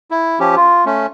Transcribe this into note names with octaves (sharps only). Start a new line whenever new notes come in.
E4
F3 C#4 G4
F4
A3 C#4